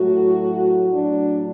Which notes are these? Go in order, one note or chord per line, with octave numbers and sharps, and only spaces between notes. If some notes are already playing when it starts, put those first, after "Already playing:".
Already playing: A2 F#3 F#4
A2 F#3 D4